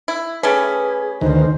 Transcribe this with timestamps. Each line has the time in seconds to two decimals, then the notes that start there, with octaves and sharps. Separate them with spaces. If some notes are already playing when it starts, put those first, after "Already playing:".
0.08 E4
0.43 G3 A3 C#4 G#4 B4
1.21 D2 D#3 C5